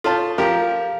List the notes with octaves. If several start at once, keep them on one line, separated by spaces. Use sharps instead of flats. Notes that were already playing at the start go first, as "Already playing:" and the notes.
F4 A4 C#5 A5
F3 G4 A#4 F5